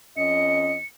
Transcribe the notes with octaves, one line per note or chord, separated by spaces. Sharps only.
F2 C#4 D#5 C#7